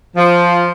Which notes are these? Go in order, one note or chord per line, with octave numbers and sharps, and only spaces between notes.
F3